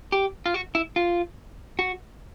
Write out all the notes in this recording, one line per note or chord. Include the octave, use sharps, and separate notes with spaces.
G4
F4
F#4
E4
F4
F#4